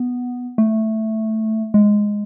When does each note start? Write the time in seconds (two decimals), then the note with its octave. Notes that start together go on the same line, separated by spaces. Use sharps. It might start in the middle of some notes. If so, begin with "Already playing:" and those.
Already playing: B3
0.58 A3
1.74 G#3